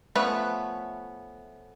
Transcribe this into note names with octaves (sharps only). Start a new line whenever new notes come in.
F3 A3 B3 C#4 B4